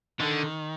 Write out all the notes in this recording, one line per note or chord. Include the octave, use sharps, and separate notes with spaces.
D3 D#3